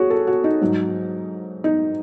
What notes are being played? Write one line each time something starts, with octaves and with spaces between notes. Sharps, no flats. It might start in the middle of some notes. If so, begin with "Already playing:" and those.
Already playing: F#4 G#4 C#5
A4
F#4
D#4
G#2 F#3
D#4